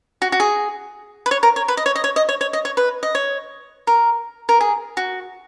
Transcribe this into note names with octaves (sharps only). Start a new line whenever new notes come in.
F#4
F#4
G#4
B4
C#5
A#4
C#5
B4
D#5
C#5
D#5
C#5
D#5
C#5
C#5
D#5
C#5
B4
D#5
C#5
A#4
A#4
G#4
F#4